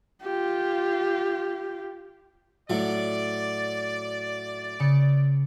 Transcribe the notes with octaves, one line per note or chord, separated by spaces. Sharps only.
F4 G4
A2 F#3 D5
C#3 C#7